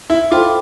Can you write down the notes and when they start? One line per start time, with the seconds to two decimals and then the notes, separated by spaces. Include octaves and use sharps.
0.10 E4
0.31 F4 A4 C5 G5 B5 D6